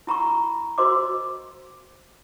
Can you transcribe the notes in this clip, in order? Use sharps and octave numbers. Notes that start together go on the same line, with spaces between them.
E4 A#5 B5 C#6
F#4 A#4 C5 D#5 C6 D6